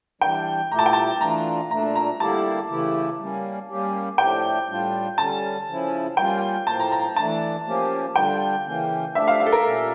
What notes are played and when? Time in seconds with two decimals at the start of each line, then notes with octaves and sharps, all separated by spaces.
0.21 E3 G3 D4 G5
0.71 A#2 A3 E4 G4 A#5
0.79 A5
0.86 G5
0.93 A5
1.21 E3 A3 D4 F4 A#5
1.70 A#2 A3 D4 A#5
1.95 A#5
2.20 D3 G3 A#3 E4 G4 A5
2.70 C#3 E3 A3 E4 G4
3.19 G3 A#3 C#4
3.69 G3 A#3 C#4 G4
4.18 A2 F3 A3 D4 G4 G5
4.68 A2 G3 D4 F4
5.18 D3 G3 C#4 A5
5.68 C#3 F3 C#4 E4
6.17 G3 A#3 C#4 F4 G5
6.67 A2 F3 A#3 A5
6.80 A#5
6.92 A#5
7.16 E3 A3 D4 A5
7.66 F3 A#3 C#4 G4
8.16 D3 G3 D4 F4 G5
8.66 C#3 E3 A#3 C#4
9.15 F3 A3 D4 G4 E5
9.28 F5
9.40 F5
9.46 A4
9.52 A#4
9.65 A#2 A3 C#4 G4